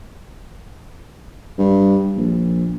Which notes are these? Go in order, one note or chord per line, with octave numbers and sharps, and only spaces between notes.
G2
A#1